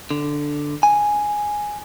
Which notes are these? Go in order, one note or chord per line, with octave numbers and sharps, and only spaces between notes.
D3
G#5